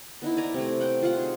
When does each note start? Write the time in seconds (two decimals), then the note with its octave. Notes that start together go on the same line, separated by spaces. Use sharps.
0.22 B3 D#4 E4
0.37 D5 G#5 A#5
0.54 C3 A3
0.80 F#5 G5
1.02 F4 F#5
1.17 D#4 G#4